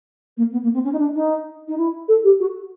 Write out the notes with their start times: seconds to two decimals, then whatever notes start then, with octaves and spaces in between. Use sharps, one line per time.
0.37 A#3
0.51 B3
0.63 A#3
0.73 C4
0.83 C#4
0.92 D#4
0.98 D4
1.14 D#4
1.67 D#4
1.77 E4
2.08 A4
2.23 G4
2.39 F#4